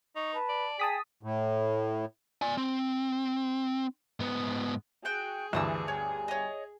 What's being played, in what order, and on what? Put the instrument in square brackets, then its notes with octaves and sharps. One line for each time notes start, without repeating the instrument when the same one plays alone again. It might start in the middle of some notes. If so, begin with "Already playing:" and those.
[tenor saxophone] D#4 [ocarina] C#6
[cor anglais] B4 [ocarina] A5
[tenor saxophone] D5
[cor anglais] G#4 [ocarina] G5 [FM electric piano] A5 D#6 B6
[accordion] A2
[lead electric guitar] D5 G#5
C4
G#2 B3
[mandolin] F#4 G5 [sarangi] G#4
[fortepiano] D2 G2 [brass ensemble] E3 [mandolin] A5 D#6 E6
[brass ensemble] G1 G3 G#5 [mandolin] C#5
[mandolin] C#5 D#5